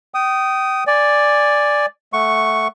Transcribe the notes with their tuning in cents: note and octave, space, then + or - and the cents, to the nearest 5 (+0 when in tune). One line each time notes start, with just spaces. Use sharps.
G5 -30 D#6 +0
D5 +0 G#5 -10
A3 -5 F#5 +0 C#6 +0